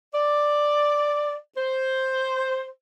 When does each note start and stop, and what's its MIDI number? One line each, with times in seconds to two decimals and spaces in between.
0.14 1.36 74
1.57 2.69 72